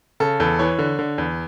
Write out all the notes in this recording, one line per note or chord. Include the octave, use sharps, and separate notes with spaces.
C#3 A4
E2 A4
E3 C#5
D3
D3
E2